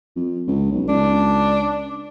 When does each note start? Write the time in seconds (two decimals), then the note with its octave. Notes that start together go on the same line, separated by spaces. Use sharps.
0.16 F2
0.48 C#2
0.72 B1
0.89 C#2 D4